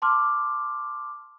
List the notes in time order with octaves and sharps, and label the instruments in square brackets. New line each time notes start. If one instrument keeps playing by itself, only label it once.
[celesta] A5 C6 D6 F6